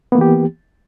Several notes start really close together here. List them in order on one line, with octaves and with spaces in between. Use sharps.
B3 A#3 E3 G4